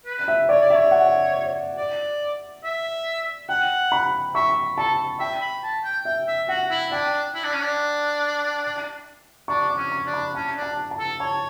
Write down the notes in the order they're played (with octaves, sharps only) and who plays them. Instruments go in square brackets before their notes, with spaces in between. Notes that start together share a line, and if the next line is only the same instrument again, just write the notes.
[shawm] B4
[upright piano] E5
[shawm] C#5 [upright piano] D5
[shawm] D5
[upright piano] E5
[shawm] C#5
[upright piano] F#5
[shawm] D5
E5
[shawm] F#5 [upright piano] G5
[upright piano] B5
[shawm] E5 [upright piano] C#6
[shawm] A4 [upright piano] A5
[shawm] E5 [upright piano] G5
[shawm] B5
A5
G5
[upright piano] E5 [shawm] G5
[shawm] E5
[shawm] F#4 [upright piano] F#5
[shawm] E4
[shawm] D4 [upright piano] G5
[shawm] E4
D4
C#4
D4
[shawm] D4 [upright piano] C#6
[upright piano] D6
[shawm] C#4
[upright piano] C#6
[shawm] D4
[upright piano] B5
[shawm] C#4 [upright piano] A5
[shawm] D4
[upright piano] A5
A5
[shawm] A4
[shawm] C#5 [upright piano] A5